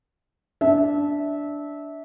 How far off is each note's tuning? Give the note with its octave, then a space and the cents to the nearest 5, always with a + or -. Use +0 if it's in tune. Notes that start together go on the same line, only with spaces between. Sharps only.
D4 -10 E5 -20